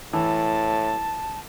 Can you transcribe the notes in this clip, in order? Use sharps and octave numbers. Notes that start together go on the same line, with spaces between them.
A2 E3 A5